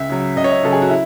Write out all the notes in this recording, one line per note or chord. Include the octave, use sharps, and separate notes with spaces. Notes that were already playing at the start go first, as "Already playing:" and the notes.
Already playing: C#2 E5
C#3 F#3
C#2 D#5
C#5
D#5
C#3 F#3 A4
G#4
F#4
E4